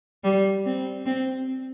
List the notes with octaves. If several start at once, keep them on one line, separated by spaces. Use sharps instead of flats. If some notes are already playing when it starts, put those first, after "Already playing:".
G3
C4
C4